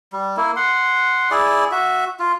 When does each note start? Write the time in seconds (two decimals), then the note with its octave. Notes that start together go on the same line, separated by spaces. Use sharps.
0.13 G3
0.37 A#3 E4
0.56 F#5 C6
1.31 E4 G#4 D5
1.72 F#4 E5
2.20 F4